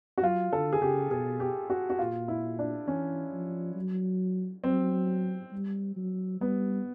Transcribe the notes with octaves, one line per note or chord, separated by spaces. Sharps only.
F#4
F#3 F4
D3 A4
G#4
C#3 G4
B2 G#4
G4
F#4
F#4
A#2 F4
E4
D4
E3 C#4
F3
F#3
F#3 C4
G3
F#3
G3 B3